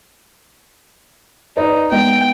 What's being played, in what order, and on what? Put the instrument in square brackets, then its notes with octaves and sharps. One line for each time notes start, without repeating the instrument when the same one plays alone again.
[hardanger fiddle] D#4 [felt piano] B4 D5 D#5
[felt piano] G#3 B3 D#5 [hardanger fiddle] G5